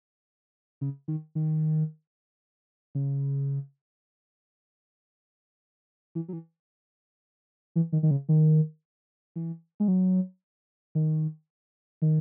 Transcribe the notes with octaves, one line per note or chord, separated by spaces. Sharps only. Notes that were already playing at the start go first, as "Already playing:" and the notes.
C#3
D#3
D#3
C#3
E3
F#3
E3
E3
D#3
D#3
C#3
D#3
E3
G#3
F#3
D#3
D#3